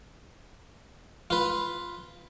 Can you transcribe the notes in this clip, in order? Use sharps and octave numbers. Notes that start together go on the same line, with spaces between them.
F4 B4